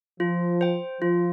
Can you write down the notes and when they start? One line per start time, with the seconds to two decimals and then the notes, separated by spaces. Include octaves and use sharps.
0.20 F3 F4
0.61 C5 G5
1.02 F3 F4